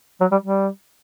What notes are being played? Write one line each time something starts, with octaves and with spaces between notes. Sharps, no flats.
F#3
G3
G3